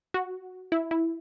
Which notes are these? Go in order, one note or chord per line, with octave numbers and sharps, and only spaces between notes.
F#4
E4
E4